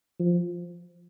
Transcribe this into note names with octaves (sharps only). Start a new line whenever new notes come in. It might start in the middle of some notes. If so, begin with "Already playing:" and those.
F3